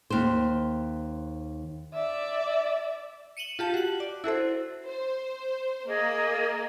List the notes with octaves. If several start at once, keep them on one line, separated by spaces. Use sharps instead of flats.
D#2 C5
D5 E5
C#7 D#7 E7 F#7 G7
F4 G4 A5
F#4 F#7
D5
E4 F#4 A4 C5
C5
A#3 G#4 D#5